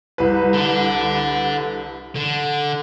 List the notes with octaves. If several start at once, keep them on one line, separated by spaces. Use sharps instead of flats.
C2 B4
D3
D3